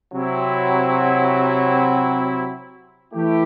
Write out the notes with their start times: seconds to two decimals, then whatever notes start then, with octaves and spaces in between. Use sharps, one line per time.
0.11 C3 F#3 C4 E4
3.13 E3 A3 E4 G4